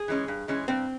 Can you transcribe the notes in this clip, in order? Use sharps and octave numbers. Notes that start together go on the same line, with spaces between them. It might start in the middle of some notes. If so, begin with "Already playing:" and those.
Already playing: G#4
E3 G#3 C#4
G2
E3 G#3 C#4
G2 C4